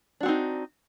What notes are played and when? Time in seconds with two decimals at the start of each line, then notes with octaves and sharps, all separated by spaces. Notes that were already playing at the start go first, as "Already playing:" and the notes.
0.21 D4
0.23 F#4
0.26 C4
0.28 D#4